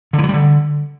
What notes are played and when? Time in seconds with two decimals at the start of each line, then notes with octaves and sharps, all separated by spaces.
0.13 D3
0.18 E3
0.24 F#3
0.29 G3
0.34 D3